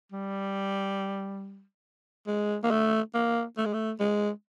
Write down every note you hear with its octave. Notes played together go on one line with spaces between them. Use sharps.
G3
G#3
A#3
A3
A#3
A3
G#3
A3
G#3